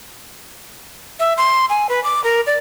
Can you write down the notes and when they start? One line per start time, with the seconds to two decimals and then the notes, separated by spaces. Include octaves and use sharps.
1.20 E5
1.38 C6
1.70 G#5
1.89 B4
2.04 D6
2.24 A#4
2.47 D5